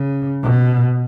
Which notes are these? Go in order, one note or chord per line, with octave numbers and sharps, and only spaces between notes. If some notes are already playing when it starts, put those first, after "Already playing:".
Already playing: C#3
B2